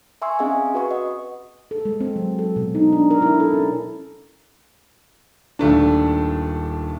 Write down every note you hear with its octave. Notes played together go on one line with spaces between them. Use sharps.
E5 G#5 C6 C#6 E6
C4 C#4 G#4 D#5 F5 G#5
F#4 B4 F#5 C#6
D#5
A4
G#3
C4
F#3
A4
B2
D#4
D4
A#4
E4
A4
C#4
D#1 A3 D4